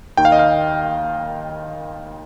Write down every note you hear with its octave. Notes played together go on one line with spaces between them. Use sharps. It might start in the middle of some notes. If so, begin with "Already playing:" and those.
D#2 D#3 G5
F5
D#5
F5